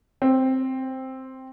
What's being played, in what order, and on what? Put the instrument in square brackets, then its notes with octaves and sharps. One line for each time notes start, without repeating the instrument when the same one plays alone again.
[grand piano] C4